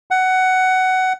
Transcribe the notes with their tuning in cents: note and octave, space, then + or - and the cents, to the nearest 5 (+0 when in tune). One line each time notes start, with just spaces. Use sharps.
F#5 +15